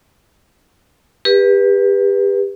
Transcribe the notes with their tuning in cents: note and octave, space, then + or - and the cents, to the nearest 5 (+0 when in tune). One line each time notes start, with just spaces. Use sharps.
G4 +30 B4 -15